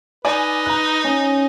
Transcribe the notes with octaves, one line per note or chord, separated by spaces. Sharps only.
D#4 B4 D5 G#5
A#5 F#6
C#4